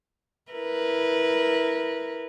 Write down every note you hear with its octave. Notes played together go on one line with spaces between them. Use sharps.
E4 A#4 B4